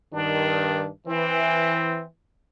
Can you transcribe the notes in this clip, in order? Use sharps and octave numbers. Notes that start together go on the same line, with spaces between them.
G2 D#3 D4
E3 C4